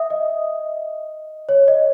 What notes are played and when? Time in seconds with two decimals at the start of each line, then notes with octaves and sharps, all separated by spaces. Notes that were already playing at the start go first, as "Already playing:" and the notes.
Already playing: E5 D#6
0.10 D#5
1.49 C#5
1.68 D#5